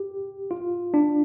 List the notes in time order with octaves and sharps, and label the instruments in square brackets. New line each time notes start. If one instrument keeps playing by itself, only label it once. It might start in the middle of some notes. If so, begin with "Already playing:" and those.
Already playing: [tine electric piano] G4
F4
D4